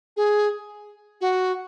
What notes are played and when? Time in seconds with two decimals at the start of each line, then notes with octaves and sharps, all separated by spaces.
0.16 G#4
1.21 F#4